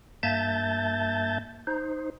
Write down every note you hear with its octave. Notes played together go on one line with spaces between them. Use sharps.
G2 A#3 E5 A5 G6 A6
D#4 C5